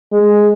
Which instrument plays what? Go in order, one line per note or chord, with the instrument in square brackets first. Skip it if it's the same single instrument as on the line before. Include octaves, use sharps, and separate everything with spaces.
[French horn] G#3